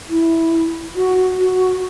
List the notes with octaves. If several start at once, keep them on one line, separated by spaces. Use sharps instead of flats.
E4
F#4
F#4